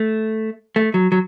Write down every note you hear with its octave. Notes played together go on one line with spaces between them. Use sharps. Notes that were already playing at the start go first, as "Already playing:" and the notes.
Already playing: A3
A3
F#3
F#3